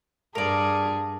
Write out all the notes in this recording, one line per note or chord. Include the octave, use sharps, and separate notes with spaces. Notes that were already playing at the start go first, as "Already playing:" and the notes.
G2 G#4 A#4 D5 A5